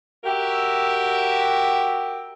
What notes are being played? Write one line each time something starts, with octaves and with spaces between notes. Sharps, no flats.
F#4 G4 A#4 E5